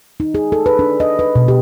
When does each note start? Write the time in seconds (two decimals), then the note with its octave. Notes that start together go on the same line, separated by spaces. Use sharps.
0.20 D#4
0.35 G#4
0.52 A4
0.66 B4
0.79 D4
1.00 D#5
1.19 B4
1.35 B2
1.48 G4